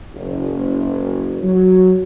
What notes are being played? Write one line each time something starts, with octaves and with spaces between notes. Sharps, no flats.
F#1
F#3